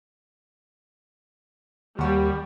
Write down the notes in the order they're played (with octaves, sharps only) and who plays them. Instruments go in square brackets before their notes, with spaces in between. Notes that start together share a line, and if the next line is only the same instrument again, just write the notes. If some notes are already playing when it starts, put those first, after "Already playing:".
[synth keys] D#2 F#4 [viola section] G3